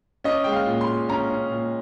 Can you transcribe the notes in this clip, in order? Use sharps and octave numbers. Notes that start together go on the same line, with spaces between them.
C#4 D#5
G#3 G5
F5
A#2
C6
A#2
C#4 A#5
C#4
A#2